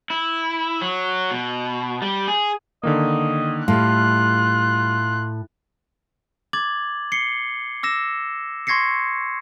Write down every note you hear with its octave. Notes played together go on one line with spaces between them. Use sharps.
E4
F#3
B2
G3
G#4
D3 D#3 A#3 D#5
A2 G3 F4 F5 F#6
D6 G#6 A6 F#7
C7 C#7 G7
D6 E6 A#6 E7
C6 C#6 G#6 A#6 C7 C#7